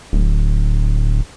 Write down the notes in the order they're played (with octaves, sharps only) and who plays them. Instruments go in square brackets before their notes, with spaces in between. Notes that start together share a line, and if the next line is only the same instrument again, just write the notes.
[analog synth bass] D1